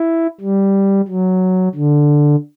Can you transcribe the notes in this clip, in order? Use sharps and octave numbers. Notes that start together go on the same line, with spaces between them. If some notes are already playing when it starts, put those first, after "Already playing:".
Already playing: E4
G3
F#3
D3